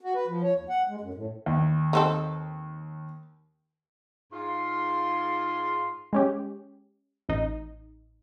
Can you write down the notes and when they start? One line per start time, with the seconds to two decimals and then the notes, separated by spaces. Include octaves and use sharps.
0.01 F#4
0.15 B4
0.28 F3
0.43 C#5
0.56 D#2
0.69 F#5
0.88 G#3
1.01 F#2
1.14 A2
1.46 D#2
1.93 D#3 C4 A4
4.32 G#2 F4 C6
6.13 G#3 C#4 G4
7.29 A1 D#4